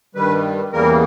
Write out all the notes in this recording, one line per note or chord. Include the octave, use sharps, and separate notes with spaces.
G2 D#3 G3 B4
E2 C#3 E3 G3 A#3 A#4